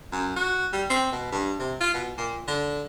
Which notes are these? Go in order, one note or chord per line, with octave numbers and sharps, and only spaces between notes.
F#2
F#4
G3
C4
B2
G2
C3
F4
B2
A#2
D3